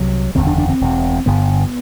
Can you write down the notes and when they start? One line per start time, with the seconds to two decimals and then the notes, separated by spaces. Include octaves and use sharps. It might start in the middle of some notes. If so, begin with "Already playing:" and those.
Already playing: C2 C3 F#3
0.35 F#1 E2 D3 C4
0.47 D4
0.58 D4
0.70 C4
0.81 E1 E2 B2
1.26 G1 G2 D3 B3